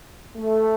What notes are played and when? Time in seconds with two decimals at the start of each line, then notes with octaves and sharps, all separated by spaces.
0.37 A3